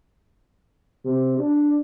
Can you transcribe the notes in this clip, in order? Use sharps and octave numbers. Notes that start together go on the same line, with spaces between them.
C3
D4